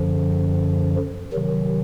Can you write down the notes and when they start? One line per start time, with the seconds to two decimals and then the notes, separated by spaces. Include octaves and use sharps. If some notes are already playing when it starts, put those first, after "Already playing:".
Already playing: F#2 D3 F3
1.33 C3 D#3 F#3